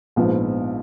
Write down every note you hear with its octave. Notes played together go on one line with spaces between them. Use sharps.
A#1 G#2 F3 B3